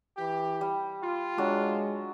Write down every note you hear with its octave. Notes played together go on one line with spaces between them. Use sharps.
E3 G4
G3
F4
F#3 G#3 D4